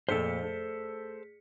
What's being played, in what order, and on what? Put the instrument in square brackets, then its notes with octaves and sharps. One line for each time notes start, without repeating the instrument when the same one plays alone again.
[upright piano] F2 A#2 A3 [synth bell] G#4 B6 C#7 [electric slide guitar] A4 C5
[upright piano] A3